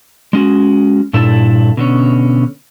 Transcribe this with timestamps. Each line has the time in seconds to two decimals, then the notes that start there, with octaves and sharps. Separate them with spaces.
0.33 G#3 C#4 F#4
1.13 G2 A#2 D4 E4 A4
1.77 B2 D3 C#4